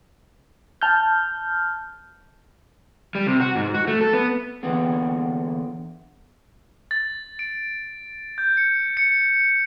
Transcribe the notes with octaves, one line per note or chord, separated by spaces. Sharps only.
A5 F6 G6
G3
C3
F#4
G#2
F#4
A3
A4
B3
A#2 D3 E3 B3 G#4
A6
D7
G6
C#7
C#7